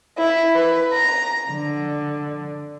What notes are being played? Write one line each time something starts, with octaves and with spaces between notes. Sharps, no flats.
E4
B4
A#5
D3